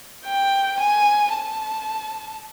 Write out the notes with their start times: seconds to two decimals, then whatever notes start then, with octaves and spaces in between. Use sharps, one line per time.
0.26 G5
0.80 G#5
1.34 A5